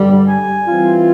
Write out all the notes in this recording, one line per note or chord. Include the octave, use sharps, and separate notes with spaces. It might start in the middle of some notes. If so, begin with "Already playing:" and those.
Already playing: G2 D3 G3
G#5
E3 G3 C4 F4